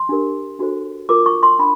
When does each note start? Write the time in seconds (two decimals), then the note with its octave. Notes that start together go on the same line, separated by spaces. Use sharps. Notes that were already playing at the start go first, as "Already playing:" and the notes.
Already playing: C6
0.09 D4 G4 A#4
0.59 D4 F#4 A4 C5
1.09 F4 A#4 C#5 D6
1.26 C#6
1.43 C6
1.59 D4 B5